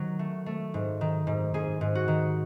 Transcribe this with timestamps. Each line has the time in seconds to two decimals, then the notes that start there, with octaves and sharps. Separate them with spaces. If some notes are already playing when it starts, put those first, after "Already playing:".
Already playing: D#3 F#3 F#4
0.19 A3
0.46 A3
0.74 G#2
1.01 D#3
1.27 G#2
1.54 G#2 G#4
1.81 G#2
1.95 F#4
2.08 D#3